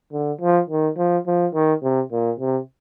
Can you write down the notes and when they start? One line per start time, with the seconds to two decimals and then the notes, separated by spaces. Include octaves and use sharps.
0.12 D3
0.41 F3
0.69 D#3
0.98 F3
1.27 F3
1.54 D#3
1.83 C3
2.12 A#2
2.39 C3